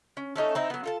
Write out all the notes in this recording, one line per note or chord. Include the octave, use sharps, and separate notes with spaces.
C#4
A3 C#4 D#4 A4
C4 D#4 E4
F#3 B3
F4 A4 A5